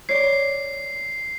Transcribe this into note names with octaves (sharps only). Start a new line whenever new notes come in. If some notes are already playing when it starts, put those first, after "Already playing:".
C#5 D5 C7